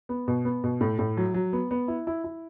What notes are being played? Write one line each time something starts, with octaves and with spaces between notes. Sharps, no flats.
B3
B2
B3
B2
A2
A2
F#3
F#3
B3
B3
E4
E4
E4